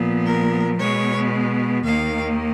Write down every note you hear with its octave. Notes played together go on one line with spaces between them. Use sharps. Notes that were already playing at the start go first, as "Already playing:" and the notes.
Already playing: A#2 F3 B3
A#4
B2 G#3 B3 C#5
D#2 D#3 A#3 F5